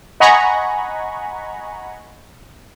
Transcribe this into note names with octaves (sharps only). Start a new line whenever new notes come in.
D#5 F#5 G#5 A#5 B5 C#6